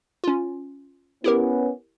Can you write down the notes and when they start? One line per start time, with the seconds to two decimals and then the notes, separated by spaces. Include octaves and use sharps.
0.24 C#4 F4
1.24 B3 C#4 E4 G4 A#4